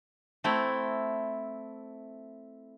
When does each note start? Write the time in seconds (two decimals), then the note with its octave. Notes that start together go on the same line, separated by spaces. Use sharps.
0.44 A3 C4 E4